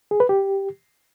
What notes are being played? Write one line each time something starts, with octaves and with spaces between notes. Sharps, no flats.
G#4
B4
G4